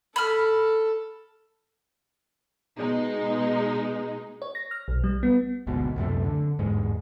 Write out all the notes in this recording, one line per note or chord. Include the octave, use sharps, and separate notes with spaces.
A4 B5 F6
B2 G#3 D#4
C#5
A#6
F6
B1
G3
B3
G#1 D2 G#2 B2
C#2 F#2 C3 A3
D3
G1 E2 G#2 G#3